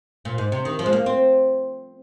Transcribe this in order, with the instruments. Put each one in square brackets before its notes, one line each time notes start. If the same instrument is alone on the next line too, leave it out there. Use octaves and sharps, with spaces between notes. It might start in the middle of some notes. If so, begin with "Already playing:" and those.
[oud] A#2
G#2
C3
D#3
F3
G#3
A#3
C4